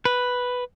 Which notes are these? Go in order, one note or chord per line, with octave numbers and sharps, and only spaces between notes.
B4